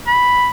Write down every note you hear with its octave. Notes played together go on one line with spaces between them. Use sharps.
B5